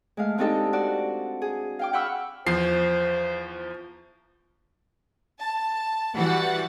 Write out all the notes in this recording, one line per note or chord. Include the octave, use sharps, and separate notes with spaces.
G#3 A3 F5
G#3 C4 D4 D#4 G4 A4
F#4 D5
G#4
F5 G5 D6
F#5 G5 B5 C#6 E6 F6
E2 F3 C5 C7
A5
E3 G3 F#4 F#5 A6